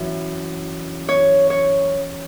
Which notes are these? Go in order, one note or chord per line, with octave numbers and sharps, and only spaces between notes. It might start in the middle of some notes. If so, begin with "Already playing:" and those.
Already playing: F#2 E3
C#5
C#5